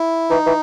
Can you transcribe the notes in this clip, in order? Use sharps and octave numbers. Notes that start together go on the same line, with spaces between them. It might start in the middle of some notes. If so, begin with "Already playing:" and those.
Already playing: E4
E3 D#4
E3